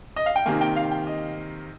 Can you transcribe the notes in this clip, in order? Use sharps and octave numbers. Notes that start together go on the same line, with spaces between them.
D#5
F5
G5
C3 D#3 A#3 G#5
G5
F5
G5
D#5